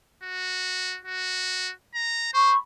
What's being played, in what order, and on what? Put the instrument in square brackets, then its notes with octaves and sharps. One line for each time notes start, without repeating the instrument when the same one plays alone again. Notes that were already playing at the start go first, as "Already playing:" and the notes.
[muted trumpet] F#4
F#4
A#5
[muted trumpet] C5 [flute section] B5 C#6